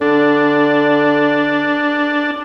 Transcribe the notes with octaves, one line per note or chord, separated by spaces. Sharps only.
D3 D4